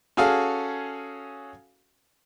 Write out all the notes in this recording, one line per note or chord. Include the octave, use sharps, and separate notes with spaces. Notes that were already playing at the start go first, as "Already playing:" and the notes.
C#4 F#4 G#4 A4 F5